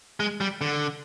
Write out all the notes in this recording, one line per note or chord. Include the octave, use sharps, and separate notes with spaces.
G#3
G3
D3